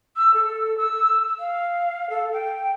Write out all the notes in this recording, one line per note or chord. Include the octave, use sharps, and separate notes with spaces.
E6
A4
E6
F5
A4
G5